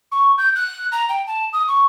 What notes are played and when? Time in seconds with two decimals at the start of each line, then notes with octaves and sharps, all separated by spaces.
0.12 C#6
0.38 G6
0.56 F#6
0.92 A#5
1.09 G5
1.27 A5
1.53 D#6
1.68 C#6